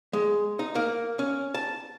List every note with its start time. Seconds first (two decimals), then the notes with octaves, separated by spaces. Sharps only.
0.13 G#3
0.59 D#4
0.75 A#3
1.19 C#4
1.54 A5